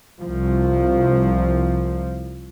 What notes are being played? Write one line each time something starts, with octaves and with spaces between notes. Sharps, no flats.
C2 F3